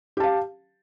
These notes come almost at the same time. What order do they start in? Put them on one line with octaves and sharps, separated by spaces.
G4 A5 F5